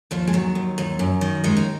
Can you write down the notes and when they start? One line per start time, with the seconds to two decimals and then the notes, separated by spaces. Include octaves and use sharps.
0.11 D#2 F3
0.27 G#3
0.33 D#3 F#3
0.55 D#2
0.78 D#2
0.99 F#2
1.21 D#3
1.44 D#2 G#3
1.57 D#4